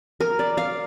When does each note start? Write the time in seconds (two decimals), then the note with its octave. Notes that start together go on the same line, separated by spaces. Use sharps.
0.20 A#4
0.39 D5
0.57 F5